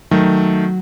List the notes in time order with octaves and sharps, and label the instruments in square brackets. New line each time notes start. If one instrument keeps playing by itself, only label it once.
[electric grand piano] D#3 A3 [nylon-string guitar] F#3